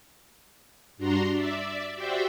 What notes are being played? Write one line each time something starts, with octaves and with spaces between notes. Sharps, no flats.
G2 D4 F#4 A#5 C6
D5 E5
F#4 G4 C5 D5 E5 G5